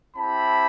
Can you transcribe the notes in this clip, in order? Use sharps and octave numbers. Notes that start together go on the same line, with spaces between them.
C4 E4 G4 A5 B5